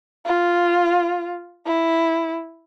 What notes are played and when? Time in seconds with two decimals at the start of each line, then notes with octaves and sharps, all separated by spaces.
0.26 F4
1.66 E4